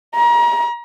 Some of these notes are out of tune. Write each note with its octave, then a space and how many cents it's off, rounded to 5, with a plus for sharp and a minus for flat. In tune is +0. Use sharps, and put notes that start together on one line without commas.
A#5 +35